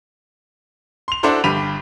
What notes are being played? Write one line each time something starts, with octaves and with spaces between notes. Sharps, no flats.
C6 F7
D4 E4 F#4 A4 C5 D5
G1 G2 G4 B5 D#7 F7